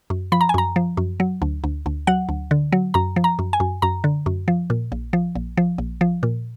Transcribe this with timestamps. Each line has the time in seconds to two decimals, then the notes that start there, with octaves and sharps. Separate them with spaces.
0.10 F#2
0.32 F3 B5
0.41 A#5
0.49 G#5
0.54 F#2 A#5
0.76 F3
0.97 F#2
1.20 F#3
1.42 D2
1.64 D2
1.86 D2
2.07 F#3 F#5
2.29 D2
2.51 D3
2.72 F#3
2.94 F#2 A#5
3.16 F3
3.24 A#5
3.39 F#2
3.53 G#5
3.60 F#2
3.82 F#2 A#5
4.04 D3
4.26 F#2
4.48 F3
4.70 A#2
4.92 A#1
5.13 F3
5.35 A#1
5.57 F3
5.78 A#1
6.01 F3
6.23 A#2